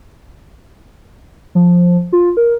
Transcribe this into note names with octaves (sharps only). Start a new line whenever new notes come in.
F3
F4
A#4